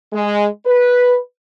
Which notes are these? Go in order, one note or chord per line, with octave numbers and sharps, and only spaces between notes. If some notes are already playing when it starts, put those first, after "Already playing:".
G#3
B4